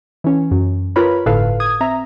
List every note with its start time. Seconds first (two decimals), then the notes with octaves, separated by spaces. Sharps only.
0.24 E3 C#4
0.51 F#2
0.96 F4 A#4 B4 C#5 B5
1.26 G1 A2 A4 B4 F5
1.60 D#6 G#6
1.81 C4 E5 A#5